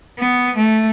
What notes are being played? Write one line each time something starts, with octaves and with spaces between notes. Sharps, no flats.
B3
A3